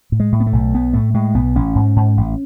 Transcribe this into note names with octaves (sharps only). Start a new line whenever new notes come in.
A2
G#3
A2
B3
A3
B1
B1 B3
A2 A3
A2 G#3
B1 B3
A1 C#4
G#2
G#2
A1